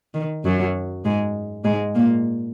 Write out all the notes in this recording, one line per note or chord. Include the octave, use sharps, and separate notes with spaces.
D#3
F#2 F#3
G#2 G#3
G#2 G#3
A#2 A#3